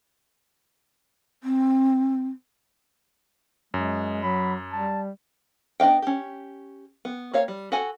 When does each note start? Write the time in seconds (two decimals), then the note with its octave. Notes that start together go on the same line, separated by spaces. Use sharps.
1.43 C4
3.74 F#2 G#3
4.23 F#3 B5
4.72 G3 A5
5.80 B3 D4 D#5 F5 G5
6.02 C#4 G4
7.05 B3
7.33 A#3 C#5 F5
7.48 G3
7.72 F#4 A4 F#5 G#5